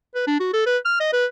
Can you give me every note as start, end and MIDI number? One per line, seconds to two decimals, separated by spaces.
0.15 0.26 71
0.28 0.40 62
0.40 0.49 66
0.54 0.62 69
0.66 0.78 71
0.85 0.96 89
1.00 1.11 75
1.13 1.26 71